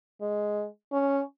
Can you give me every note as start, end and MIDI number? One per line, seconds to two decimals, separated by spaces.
0.21 0.66 56
0.92 1.21 61